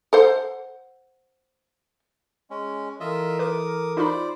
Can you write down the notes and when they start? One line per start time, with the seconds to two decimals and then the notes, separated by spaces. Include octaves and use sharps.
0.13 A4 C5 F#5
2.50 G#3 C#4
3.00 E3 F4 A4 A#4 D#5 E5
3.39 B4 D6 D#6
3.97 D#4 F4 C5 D5 B5